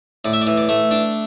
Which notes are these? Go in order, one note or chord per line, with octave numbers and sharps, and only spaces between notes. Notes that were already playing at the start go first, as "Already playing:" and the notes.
A2 D5
E5
D5
E3
D5
A3
D4 D5